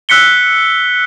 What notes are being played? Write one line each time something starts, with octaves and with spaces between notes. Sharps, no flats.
E6 F#6 B6 C#7 G7